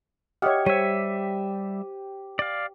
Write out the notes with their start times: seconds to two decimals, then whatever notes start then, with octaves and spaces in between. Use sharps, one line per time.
0.42 G4 C#5 D#5 E5 F#5 D#6 F6
0.66 G3 C5 C#5 E5 D#7
2.39 D5 F5